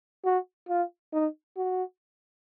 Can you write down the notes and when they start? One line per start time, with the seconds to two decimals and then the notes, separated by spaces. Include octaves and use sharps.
0.25 F#4
0.69 F4
1.13 D#4
1.57 F#4